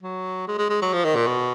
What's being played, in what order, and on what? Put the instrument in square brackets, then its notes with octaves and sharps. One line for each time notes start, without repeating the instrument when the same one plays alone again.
[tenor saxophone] F#3
G#3
G#3
G#3
F#3
F3
D#3
A#2
B2